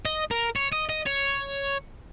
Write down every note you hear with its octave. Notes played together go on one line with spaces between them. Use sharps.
D#5
A#4
C#5
D#5
D#5
C#5